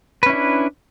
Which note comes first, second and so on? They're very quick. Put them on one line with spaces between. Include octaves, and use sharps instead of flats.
B4 C#4 E4 D4